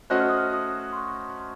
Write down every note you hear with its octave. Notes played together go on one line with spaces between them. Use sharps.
A3 C#4 F#4 C5 D#5 F#6
F6
D#6
F6
D#6
C6
C#6
C6